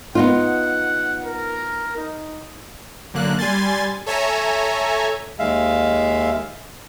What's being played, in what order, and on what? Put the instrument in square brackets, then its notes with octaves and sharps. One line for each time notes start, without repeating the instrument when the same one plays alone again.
[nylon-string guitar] B3 D#4 F4 [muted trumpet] F#5
[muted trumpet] A#4
D#4
[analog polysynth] F#2 D3 A#3 F#6
G3 G#5 C6 A6
A4 C#5 E5 G#5 A#5
[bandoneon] D#2 G#3 E5 F5